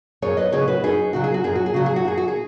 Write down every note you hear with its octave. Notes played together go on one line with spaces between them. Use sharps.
F#2 G#4 C#5
B4 D#5
C#3 F#3 G#4 C#5
F#4 B4
F#2 D#4 G#4
C#3 F#3 F#4
G#4
F#4
F#2 G#4
F#4
G#4
C#3 F#3 F#4
G#4
F#4
F#2 G#4
F#4
G#4